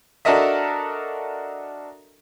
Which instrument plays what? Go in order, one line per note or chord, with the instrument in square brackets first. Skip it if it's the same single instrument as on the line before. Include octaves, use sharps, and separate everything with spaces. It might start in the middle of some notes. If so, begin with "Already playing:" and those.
[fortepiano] D4 F#4 A4 A#4 D#5 E5